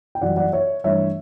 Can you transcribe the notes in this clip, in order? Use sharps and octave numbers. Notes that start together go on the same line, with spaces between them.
G5
F#2 E3 G3 D5 F#5
D5 F#5
C#5 E5
G2 E3 A3 C#5 E5